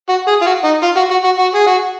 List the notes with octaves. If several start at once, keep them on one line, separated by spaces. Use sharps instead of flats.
F#4
G#4
F4
F#4
D#4
F4
F#4
F#4
F#4
F#4
G#4
F#4